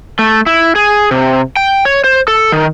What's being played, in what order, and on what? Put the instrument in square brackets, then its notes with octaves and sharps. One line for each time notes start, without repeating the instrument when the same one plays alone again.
[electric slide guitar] A3
E4
G#4
C3
G5
C#5
C5
A4
D#3